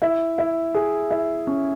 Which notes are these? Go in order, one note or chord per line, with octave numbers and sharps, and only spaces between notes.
E4
E4
G#4
E4
C#4